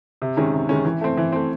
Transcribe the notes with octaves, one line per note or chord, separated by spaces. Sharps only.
C3
D#3 G#3 C#4
C3
D#3 G#3 C#4
E3
A3 C4
E3
A3 C4